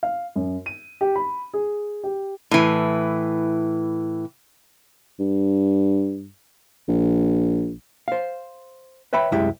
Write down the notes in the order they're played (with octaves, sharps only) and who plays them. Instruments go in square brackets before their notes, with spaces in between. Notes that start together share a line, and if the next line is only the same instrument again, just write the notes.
[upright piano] F5
F#2
D#7
G4
B5
G#4
G4
[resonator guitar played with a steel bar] A2 E3
[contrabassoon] G2
A#1
[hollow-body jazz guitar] C5 F5
B4 C#5 E5 G5 B5
C2 F#2 G#3 E4 G4 E5